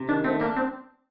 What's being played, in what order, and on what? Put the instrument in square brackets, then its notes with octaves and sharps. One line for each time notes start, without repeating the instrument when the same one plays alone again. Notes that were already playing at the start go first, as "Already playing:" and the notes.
Already playing: [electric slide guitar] C3
[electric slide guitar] D#3 [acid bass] D4
[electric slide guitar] A3 [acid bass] C4
[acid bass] A#3 [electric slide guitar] D4
[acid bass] C4